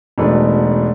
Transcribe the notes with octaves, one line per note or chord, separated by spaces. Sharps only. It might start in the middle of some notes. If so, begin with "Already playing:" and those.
E1 B2 E3 A3 D4 D#4